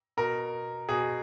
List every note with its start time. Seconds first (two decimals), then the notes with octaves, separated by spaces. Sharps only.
0.17 B2 A#4
0.89 B2 G#4